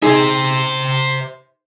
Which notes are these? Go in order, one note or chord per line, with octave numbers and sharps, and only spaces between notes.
D#4 G#4 C5 E5 C7